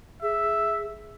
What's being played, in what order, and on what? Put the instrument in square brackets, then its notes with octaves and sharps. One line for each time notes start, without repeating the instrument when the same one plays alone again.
[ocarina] G#4 [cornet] E5